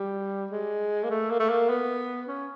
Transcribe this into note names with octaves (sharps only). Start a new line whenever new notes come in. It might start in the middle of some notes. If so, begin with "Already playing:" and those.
Already playing: G3
G#3
A#3
A3
A#3
A3
A#3
B3
C#4